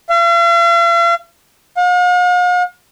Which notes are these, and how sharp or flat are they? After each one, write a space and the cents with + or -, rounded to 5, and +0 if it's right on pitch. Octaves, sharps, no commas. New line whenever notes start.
F5 -45
F5 +45